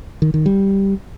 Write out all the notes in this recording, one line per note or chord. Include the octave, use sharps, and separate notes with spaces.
D#3
D#3
G3